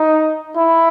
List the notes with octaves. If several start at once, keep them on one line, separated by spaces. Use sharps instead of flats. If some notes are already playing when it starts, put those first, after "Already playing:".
Already playing: D#4
E4